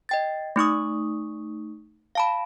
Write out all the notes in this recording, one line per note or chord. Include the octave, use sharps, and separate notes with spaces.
D#5 G5 A6
A3 D#4 C#6 D#6
F5 A5 B5